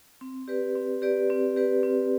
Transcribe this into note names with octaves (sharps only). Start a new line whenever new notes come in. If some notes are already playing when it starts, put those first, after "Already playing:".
C4
G4 B4 D5
C4
G4 B4 D5
C4
G4 B4 D5
C4